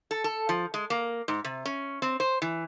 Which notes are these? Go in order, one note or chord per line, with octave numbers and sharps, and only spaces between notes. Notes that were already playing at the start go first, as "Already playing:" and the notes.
A4
A4
F3
G#3
A#3
G#2
C3
C#4
C4
C5
E3